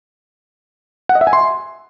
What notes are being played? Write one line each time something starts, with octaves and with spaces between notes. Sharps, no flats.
F#5
D#5
E5
G#5
C6